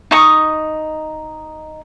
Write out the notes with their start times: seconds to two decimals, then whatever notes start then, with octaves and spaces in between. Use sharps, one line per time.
0.11 D#4 C#6 D#6